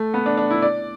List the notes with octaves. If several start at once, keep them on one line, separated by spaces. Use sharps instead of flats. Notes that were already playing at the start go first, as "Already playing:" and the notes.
Already playing: A3
B3
D4
D4
E4
D5